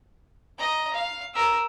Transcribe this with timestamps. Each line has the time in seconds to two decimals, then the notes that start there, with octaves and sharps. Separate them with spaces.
0.58 D#5 A#5
0.94 F5
1.34 A#4 E6